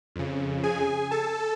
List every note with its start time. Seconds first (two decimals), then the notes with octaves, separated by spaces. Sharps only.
0.16 F2 C#3
0.63 G#4 G#5
1.11 A4 A5